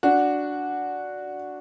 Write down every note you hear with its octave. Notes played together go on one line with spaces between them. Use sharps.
D4 F#4